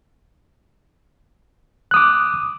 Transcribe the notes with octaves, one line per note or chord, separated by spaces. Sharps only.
D6 D#6 F#6